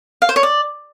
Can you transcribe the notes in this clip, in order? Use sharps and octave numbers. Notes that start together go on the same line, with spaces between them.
F5
C5
C#5
D5